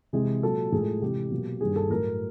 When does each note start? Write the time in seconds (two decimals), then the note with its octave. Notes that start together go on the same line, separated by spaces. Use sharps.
0.13 C3 E3 G#3 G#4
0.42 A#2 F#3 A#3 A4
0.72 A2 F3 G#3 G#4
0.82 A4
1.02 C3 E3 G#3 G4
1.31 B2 F#3 A#3
1.61 G2 D#3 G3 A#3 G#4
1.76 A4
1.90 A2 F#3 A3 A#4